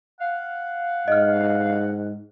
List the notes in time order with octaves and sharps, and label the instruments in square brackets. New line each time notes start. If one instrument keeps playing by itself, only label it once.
[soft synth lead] F5 [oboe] F#5
[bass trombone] G#2 [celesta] D#5 F6